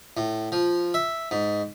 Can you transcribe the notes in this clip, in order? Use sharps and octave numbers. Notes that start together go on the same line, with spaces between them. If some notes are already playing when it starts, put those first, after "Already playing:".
A2
F3
E5
G#2